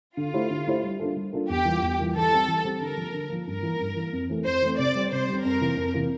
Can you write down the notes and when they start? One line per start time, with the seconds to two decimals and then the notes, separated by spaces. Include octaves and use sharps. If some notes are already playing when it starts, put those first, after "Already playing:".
0.17 D3 F4
0.33 A3 E4 G4 C5
0.50 D3
0.67 A3 E4 G4 C5
0.83 G3
1.00 A#3 D4 F4 A4
1.16 G3
1.33 A#3 D4 F4 A4
1.49 E2 G4
1.65 E3 G3 A#3 F4
1.82 E2
1.98 E3 G3 A#3 F4
2.15 E3 A4
2.31 G3 C4 G4
2.48 E3
2.64 G3 C4 G4
2.81 D3 A#4
2.97 F3 A#3
3.14 D3
3.30 F3 A#3
3.47 G2 A#4
3.63 E3 A#3
3.80 G2
3.96 E3 A#3
4.13 F2
4.29 E3 A3 C4
4.45 F2 C5
4.62 E3 A3 C4
4.79 C3 D5
4.95 G3 C4
5.11 C3 C5
5.28 G3 C4
5.45 F2 A#4
5.61 C3 E3 A#3
5.77 F2
5.94 C3 E3 A#3